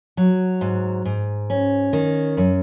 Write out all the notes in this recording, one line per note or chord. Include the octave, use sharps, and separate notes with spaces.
F#3
G#2
G#2
C#4
D#3
F#2